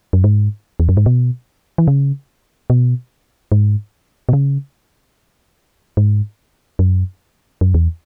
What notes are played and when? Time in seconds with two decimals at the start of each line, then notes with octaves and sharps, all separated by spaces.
0.13 F#2
0.24 G#2
0.80 E2
0.89 F#2
0.97 G#2
1.06 B2
1.78 E3
1.88 C#3
2.70 B2
3.52 G#2
4.29 B2
4.33 C#3
5.97 G#2
6.79 F#2
7.61 F#2
7.74 E2